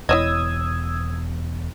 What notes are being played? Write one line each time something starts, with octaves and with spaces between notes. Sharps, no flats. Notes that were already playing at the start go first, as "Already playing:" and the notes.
E1 E2 E4 C#5 D#5 D#6 E6 G#6